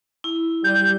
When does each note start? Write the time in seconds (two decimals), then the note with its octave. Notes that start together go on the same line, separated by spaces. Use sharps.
0.24 E4
0.64 G3 G6